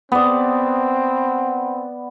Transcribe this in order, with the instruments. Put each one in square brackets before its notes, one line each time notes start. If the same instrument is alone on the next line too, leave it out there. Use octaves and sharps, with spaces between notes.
[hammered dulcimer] B3 D5 [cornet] C4